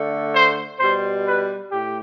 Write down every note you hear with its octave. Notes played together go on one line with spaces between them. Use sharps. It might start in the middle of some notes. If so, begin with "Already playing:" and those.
Already playing: D3 A3
C5
B2 G3 C5
B4
A2 G4